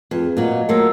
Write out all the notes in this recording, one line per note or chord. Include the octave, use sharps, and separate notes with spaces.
F2 G#4 B4
A#2 F#3 D#5 F5
F#3 A3 A#3 F4 A#4 E6